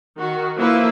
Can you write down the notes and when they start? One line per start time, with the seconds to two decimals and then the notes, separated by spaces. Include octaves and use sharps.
0.17 D#3 F#4
0.57 F3 A#3 E4 B4